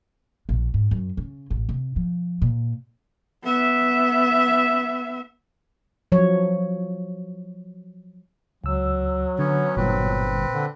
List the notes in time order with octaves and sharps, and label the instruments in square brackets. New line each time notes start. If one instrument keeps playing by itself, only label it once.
[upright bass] A#1
G#2
F#2
C#3
A1
C3
F3
A#2
[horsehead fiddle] B3 E5
[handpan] F3 F#3 C#5
[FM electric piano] C#2 E6 [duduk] F#3
[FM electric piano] D3 [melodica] B3 C#4 C#5
[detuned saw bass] G1 [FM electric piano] A#2 [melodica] C4 B4
[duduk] D3